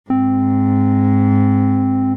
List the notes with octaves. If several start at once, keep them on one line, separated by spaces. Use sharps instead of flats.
G#2 C4